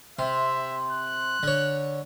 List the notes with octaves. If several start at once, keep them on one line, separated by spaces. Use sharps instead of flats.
C3 E5 C6
F#6
D3 C#5